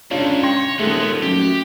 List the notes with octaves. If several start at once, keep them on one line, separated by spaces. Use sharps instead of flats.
G#2 C#3 D4 F4 C#5
C#5 G5 C6 A#6
D#1 G#3 A3 B3
F#2 G4